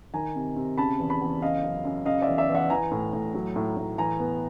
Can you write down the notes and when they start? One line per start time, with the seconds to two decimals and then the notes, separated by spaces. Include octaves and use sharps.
0.14 D#3 G#5 A#5
0.36 C3
0.56 C3
0.78 C#3 A5 B5
0.99 E2
1.10 A5 B5
1.21 E2
1.42 C#3 D#5 F5
1.63 F#2
1.85 F#2
2.06 C#3 D#5 F5
2.22 D5 E5
2.28 E2
2.38 D5 E5
2.49 E2
2.55 E5 F#5
2.70 E3 G#5 A#5
2.91 A2
3.13 A2
3.34 F#3
3.56 A2
3.77 A2
3.98 E3 G#5 A#5
4.19 B3